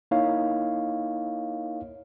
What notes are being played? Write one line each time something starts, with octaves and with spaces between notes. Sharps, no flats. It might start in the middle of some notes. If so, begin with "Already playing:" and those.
A#3 D#4 E4 C#5 F5